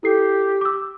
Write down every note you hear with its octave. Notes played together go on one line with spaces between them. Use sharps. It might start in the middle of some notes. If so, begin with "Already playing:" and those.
E4 G4 A4 C7
D6 E6